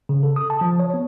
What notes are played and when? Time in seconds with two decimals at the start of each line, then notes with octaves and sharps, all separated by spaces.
0.09 C#3
0.23 A4
0.36 D#6
0.50 A5
0.61 F3
0.80 C#5
0.94 B3